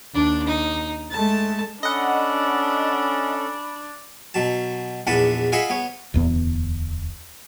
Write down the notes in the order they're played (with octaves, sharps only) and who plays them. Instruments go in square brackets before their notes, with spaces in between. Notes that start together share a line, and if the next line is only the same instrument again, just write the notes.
[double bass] D#2 [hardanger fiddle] D4
[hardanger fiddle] D#4
[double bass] G#3 A3 [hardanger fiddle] A5
[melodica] C#4 A4 [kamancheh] D4 [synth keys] D#5 F#5 [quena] B5
[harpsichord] B2 F#3 A5
A#1 E2 D4 B4 F#5 A5
F4 G#4 D#5 E5 F#5 B5
B3 C#5
[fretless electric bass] D1 E2 B3